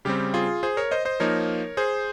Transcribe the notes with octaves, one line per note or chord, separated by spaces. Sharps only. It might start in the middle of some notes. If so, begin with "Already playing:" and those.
C#3 G3 C4 G4
F4 G#4
G#4 C5
A#4 C#5
C5 D#5
C5 D#5
F3 A#3 D#4 A#4 C#5
G#4 C5